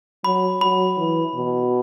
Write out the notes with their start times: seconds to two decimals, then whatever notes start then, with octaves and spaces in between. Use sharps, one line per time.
0.24 F#3 B5
0.61 F#3 B5
0.97 E3
1.35 B2